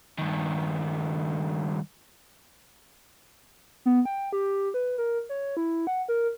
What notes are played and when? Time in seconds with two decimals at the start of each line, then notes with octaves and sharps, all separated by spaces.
0.19 G2 D#3
3.86 B3
4.05 G5
4.32 G4
4.74 B4
4.98 A#4
5.29 C#5
5.57 E4
5.87 F#5
6.08 A#4